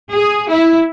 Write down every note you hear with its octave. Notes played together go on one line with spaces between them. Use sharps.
G#4
E4